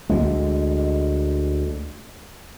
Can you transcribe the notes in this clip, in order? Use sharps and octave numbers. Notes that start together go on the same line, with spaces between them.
D2 G#3